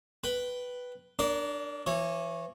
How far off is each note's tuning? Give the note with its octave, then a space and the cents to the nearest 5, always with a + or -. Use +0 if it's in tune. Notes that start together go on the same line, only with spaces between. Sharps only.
B4 +0 G5 -10
D4 +15 A#4 +0 D5 -35
E3 +25 C#5 -20